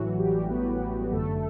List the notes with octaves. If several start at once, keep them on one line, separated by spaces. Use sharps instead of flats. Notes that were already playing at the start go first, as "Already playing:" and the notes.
Already playing: A1 A2 E3 F#3 F#4
G3 G4
A1 A2 E3 B3 B4
G1 F#2 D3 A3 A4